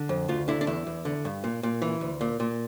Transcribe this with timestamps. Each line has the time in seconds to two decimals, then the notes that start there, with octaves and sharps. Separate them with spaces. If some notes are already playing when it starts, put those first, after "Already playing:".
Already playing: D3
0.09 F2
0.28 D2 F4
0.48 D3 E4
0.61 D4
0.67 E2 E4
0.87 E2
1.05 D3
1.25 G2
1.44 A#2
1.63 A#2
1.82 E3
2.01 D2
2.21 A#2
2.40 A#2